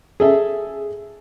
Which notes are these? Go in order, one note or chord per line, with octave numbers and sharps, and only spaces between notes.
G#4 A4 E5